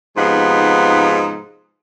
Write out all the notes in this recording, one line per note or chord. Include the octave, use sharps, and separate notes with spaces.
G#2 C3 F3 B3 D#4